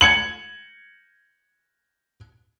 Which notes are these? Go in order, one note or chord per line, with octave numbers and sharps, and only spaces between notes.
G#6 C#7 F#7